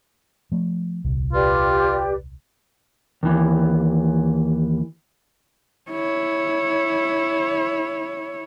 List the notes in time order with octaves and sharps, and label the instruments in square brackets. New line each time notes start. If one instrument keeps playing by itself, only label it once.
[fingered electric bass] F3 A3
D#1 C2
[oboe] F4 [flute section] G4 B4 D5
[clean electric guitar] D#2 E3
[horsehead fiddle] E4 C#5